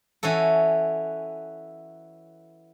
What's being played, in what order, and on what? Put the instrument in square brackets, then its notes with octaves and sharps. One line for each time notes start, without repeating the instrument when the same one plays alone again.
[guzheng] E3 C#4 F#4 A4